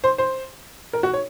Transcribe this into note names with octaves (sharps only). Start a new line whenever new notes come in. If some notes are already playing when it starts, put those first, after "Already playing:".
C5
C5
A#4
F#4
C#5